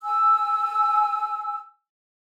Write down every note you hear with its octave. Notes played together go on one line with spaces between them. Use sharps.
G#5 E6